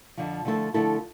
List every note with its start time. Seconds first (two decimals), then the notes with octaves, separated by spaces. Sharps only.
0.17 F2 D3 F3
0.45 D3 F3 A3 E4 A4
0.74 D3 F3 A3 E4 A4